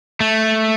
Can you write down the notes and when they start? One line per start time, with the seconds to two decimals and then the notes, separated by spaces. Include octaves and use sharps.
0.20 A3